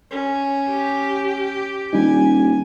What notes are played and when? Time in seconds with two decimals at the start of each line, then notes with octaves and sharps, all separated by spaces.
0.11 C#4
0.70 G4
1.93 D#1 G3 D4 D#4 G#5